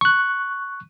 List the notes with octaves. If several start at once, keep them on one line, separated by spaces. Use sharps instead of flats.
C#6 F#6